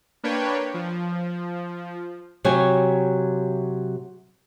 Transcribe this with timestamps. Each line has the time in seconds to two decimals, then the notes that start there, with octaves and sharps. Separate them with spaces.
0.23 A#3 D4 B4 C#5 G5
0.74 F3
2.44 C3 F#3 G4 C#5 G#5